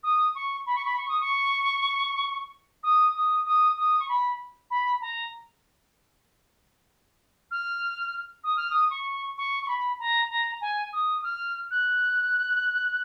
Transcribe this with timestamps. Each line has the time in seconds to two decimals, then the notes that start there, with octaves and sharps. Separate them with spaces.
0.03 D#6
0.35 C#6
0.66 B5
0.75 C#6
0.85 B5
0.97 C#6
1.08 D#6
1.20 C#6
2.83 D#6
3.15 D#6
3.46 D#6
3.77 D#6
3.99 C#6
4.08 B5
4.70 B5
5.01 A#5
7.51 F6
8.43 D#6
8.56 F6
8.70 D#6
8.90 C#6
9.37 C#6
9.63 C#6
9.68 B5
9.99 A#5
10.30 A#5
10.61 G#5
10.93 D#6
11.18 D#6
11.23 F6
11.70 F#6